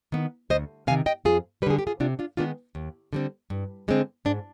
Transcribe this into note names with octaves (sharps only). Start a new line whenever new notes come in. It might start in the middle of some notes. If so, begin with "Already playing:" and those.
D#3 B3
D2 C5 D#5
C3 D#3 F5 G#5
D#5 G5
F2 F4 G#4
D3 G3 G#4 B4
G4
F4 G#4
C3 D4 F4
D4 F4
D#3 G#3 B3 D4 F4
D#2
D3 G3 C4
G2
D3 G#3 C4
G#2 D4